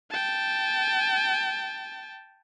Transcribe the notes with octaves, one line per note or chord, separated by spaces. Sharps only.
G5 A5